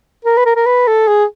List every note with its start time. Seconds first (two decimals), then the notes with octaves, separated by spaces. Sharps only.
0.25 A#4
0.37 B4
0.46 A#4
0.56 A#4
0.66 B4
0.87 A4
1.08 G#4